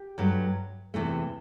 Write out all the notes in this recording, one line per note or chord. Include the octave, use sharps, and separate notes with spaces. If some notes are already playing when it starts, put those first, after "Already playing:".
Already playing: G4
G2 F#3 A3
E2 C3 E3 A3